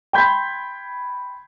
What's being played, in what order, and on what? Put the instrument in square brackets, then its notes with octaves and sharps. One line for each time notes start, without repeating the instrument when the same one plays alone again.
[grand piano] G5 B5 C6 G6 G#6 B6